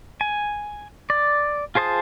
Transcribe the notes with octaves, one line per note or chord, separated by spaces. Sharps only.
G#5
D5
F4 G#4 C5 A5 D#6